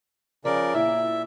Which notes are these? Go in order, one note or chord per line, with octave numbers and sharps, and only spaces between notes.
C#3 F3 A#4 D5
A#2 E4 E5